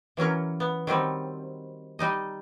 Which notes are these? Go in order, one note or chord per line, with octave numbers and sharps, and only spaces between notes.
E3 F#3 C#4 A#4
B3
D#3 F#3 G3 C4
G3 D#4 D#5